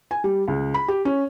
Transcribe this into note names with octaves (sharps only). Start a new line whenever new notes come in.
G#5
G3
C#2
B5
G4
C#4